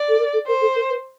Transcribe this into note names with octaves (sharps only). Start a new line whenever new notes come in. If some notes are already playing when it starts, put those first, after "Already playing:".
Already playing: D5
A4
A#4
A4
A#4 C5
A4
A#4
B4